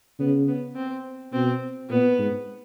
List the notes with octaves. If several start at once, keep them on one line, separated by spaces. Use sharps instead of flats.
C#3 B3
B3
C4
B2 C4
A#2 B3
G#2